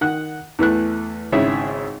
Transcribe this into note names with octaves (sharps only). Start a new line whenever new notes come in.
D#3 F#5 F#6
E2 E3 A3 F#6
G#1 C#3 E4 G#4 C#5 E5